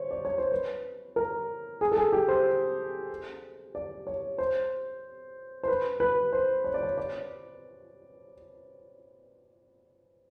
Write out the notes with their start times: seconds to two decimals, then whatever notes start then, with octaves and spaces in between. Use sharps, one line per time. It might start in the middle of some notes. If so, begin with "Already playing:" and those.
Already playing: C5 C#5
0.11 D5
0.25 C#5
0.38 C5
0.52 B4
1.16 A#4
1.81 G#4
1.92 A4
1.97 G#4
2.13 G4
2.28 C5
3.75 D5
4.07 C#5
4.38 C5
5.63 C5
5.68 B4
6.00 B4
6.33 C5
6.64 C#5
6.74 D5
6.83 C#5
6.98 D5